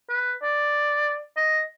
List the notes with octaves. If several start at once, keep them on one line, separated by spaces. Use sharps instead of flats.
B4
D5
D#5